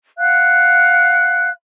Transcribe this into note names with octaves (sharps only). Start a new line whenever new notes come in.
F5 F#5 F#6